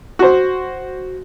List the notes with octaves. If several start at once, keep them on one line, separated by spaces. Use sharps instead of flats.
F#4 C5